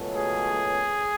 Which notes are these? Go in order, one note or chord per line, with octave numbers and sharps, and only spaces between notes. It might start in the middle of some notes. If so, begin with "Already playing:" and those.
Already playing: C#2 B2 F#3 A3 C#4
G#4